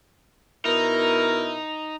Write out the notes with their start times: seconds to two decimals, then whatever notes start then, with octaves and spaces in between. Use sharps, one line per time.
0.65 B2 D#4 E4 A#4